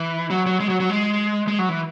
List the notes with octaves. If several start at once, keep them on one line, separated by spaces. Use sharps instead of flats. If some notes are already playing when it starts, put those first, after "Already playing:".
Already playing: E3
F#3
F#3
G#3
F#3
F#3
G#3
G#3
F#3
E3